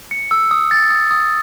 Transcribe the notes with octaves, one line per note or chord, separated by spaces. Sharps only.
C#7
E6
D#6
A6
D#6
D#6